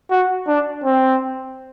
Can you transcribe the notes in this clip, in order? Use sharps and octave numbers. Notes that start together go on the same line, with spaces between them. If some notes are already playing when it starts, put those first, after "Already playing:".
F#4
D4
C4